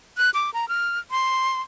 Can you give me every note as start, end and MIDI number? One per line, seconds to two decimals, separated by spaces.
0.18 0.30 90
0.34 0.50 86
0.54 0.68 82
0.69 0.99 89
1.11 1.61 84